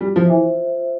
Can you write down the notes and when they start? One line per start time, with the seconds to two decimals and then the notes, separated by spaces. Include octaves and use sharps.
0.01 G3 F4
0.16 F3
0.24 C5 E5
0.30 E3